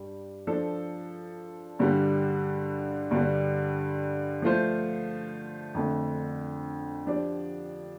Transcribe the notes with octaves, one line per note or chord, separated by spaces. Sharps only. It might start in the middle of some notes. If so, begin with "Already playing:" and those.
Already playing: G2 G3
F3 D4 A4
G2 D3 G3
G2 D3 G3
F3 A3 F4 C5
F2 D3 A3
F3 D4 G4 D5